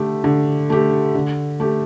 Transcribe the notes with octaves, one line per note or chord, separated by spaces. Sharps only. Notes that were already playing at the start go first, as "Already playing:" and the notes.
Already playing: D3 A3 G4
D3
A3 G4
D3
A3 G4